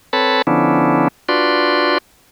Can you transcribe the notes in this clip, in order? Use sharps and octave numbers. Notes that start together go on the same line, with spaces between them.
C4 A4 B4 C#5 A5 B5
D3 F3 B3 C#4 D4 E4
D4 F4 F#4 B4 D5 C6